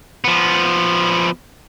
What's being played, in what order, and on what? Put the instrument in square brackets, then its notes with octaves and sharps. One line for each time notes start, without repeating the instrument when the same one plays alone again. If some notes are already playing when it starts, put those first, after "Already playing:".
[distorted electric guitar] F3 B3